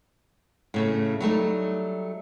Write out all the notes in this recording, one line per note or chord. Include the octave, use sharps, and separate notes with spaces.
A2 C#3 A3
F#3 G3 A3 D#4